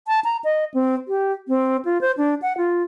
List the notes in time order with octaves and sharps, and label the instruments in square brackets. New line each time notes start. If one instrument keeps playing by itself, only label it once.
[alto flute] A5
A#5
D#5
C4
G4
C4
F4
C5
D4
F#5
F4